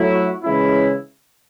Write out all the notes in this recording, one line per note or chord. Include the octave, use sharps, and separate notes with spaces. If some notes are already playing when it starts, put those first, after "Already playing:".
Already playing: F#3 A3 E4
F#4
C#3 E3 G#3 C#4 E4